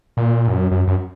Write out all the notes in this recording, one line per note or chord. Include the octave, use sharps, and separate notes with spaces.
A#2
F#2
F#2
F#2